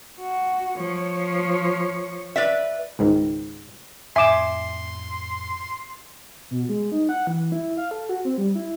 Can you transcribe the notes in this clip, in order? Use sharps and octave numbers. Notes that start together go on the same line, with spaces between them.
F#4
F3 C#5
B4 D5 E5
C#2 G#2 D#3
F2 A2 E5 G#5 C6 D6 E7
B2
G#3
D#4
F#5
E3
E4
F5
A4
F#4
C4
G3
E4